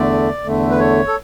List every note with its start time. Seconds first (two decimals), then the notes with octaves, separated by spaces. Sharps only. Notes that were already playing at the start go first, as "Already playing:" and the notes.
Already playing: E2 D3 A3 D5
0.44 E2 D3 A3
0.71 B4
0.79 C#5
1.07 A4